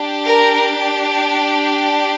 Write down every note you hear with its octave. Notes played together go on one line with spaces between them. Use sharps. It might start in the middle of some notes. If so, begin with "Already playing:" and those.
Already playing: D4 G4
A#4